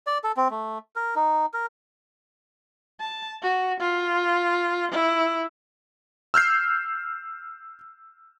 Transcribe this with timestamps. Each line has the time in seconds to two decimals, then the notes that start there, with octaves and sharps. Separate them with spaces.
0.07 D5
0.24 A4
0.37 C4
0.51 A3
0.96 A#4
1.16 D#4
1.54 A#4
3.00 A5
3.42 F#4
3.80 F4
4.91 E4
6.34 E6 F6 G6 C7